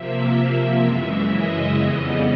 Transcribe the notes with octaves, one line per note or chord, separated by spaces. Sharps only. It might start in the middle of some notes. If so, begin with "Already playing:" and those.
Already playing: C3 F3 A#3 E5
F#2 C#3 E3 G#3 E5
D#5
F2 C#3 E3 G3 B3 D#5